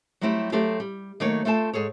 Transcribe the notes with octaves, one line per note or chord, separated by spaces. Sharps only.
F#3 G3 A3 C4 E4 G4
F#3 A3 C4 G4 A4 F5
G3
D#3 F#3 A3 A#3 D#4 C#5
A3 C4 F4 A4 G5 A5
G#2 G#4 A4 C#5